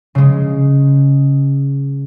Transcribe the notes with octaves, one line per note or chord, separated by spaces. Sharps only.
C#3 G#3